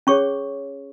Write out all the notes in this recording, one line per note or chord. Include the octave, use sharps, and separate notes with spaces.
C#4 G#4 C#5 C#6